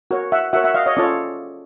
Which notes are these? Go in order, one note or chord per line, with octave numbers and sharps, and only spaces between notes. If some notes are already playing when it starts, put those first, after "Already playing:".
F#4 A#4 C#5
E5 F#5
F#4 A#4 C#5 E5 F#5
E5 F#5
D#5 F5
C#5 D#5
C#4 F4 A4 C#5 D5